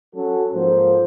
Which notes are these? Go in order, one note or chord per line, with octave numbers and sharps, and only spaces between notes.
F#3 C#4 F#4 A4
G#2 F3 A#3 A4 C5